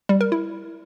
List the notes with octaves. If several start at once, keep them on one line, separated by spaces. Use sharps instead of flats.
G3
A#4
E4